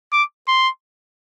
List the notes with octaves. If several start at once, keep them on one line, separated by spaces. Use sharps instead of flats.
D6
C6